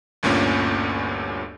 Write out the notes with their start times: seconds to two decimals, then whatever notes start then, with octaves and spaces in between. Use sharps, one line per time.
0.23 G1 D2 G2 A#2 C#4